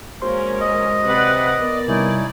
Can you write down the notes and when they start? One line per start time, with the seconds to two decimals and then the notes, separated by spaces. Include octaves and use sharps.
0.22 G#3 A#3 C#4 F#4 A#4 C5 C6
0.61 D#5
1.04 C3 B4 D5 F#5
1.58 B3 A#4 D5
1.88 C3 G3 C#4 D#4 E4